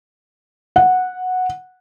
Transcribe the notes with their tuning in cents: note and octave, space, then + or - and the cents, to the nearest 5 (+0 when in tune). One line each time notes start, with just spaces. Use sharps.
F#5 -10